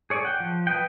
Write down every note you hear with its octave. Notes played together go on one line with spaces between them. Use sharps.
G#4 C#5 D5 G#5
F#5 G5
F3
B4 D#5 F#5 G5